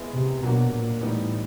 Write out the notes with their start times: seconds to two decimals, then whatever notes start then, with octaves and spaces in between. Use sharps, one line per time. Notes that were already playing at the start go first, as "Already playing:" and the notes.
Already playing: G#3 B3 E4
0.13 C3
0.43 B2 F#3 A#3 D4 F#4
0.72 A#2
1.01 A2 E3 G3 B3 D#4